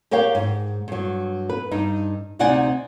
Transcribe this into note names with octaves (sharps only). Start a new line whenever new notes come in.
G4 A#4 C#5 F5 G5
G#2
G2 F#3
B4
G2 D#4
D2 C3 D#4 D5 F#5 G#5